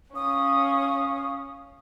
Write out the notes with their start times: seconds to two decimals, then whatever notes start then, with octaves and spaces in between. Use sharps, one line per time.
0.15 C#4 F5 D#6